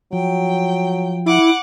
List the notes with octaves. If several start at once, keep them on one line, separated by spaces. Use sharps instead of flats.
F3 F#3 G5
E4 F#5 D6